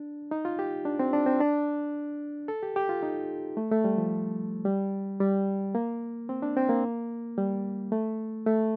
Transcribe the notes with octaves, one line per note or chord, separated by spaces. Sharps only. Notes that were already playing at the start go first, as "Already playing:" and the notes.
Already playing: D4
D#4
F4
G4
D4
C4
D4
C4
D4
A4
G4
G4
F4
D#4
A3
A3
G3
F3
G3
G3
A#3
C4
D4
C4
A#3
G3
A3
A3